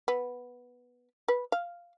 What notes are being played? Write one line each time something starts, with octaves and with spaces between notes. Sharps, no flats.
B3
B4
F5